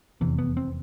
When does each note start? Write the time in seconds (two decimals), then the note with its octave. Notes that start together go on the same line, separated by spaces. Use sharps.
0.21 F1 E2 C3 E3
0.39 B3
0.57 C4